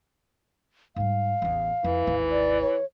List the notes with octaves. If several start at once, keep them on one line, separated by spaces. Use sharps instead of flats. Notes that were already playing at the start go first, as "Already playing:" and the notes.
G#2 G3 F5
A1 E2
F2 E3
G#1 D#2
D5
C#5